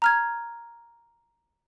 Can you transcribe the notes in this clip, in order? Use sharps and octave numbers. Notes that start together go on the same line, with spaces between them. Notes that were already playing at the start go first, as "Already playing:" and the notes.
A#5 F6 G#6